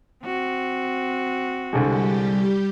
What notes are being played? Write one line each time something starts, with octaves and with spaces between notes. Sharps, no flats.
C4 F#4
C2 D3 G3 G#3 G4